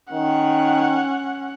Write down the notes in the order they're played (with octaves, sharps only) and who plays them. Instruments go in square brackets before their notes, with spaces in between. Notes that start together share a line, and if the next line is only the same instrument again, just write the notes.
[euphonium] D#3 [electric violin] C#4 F#5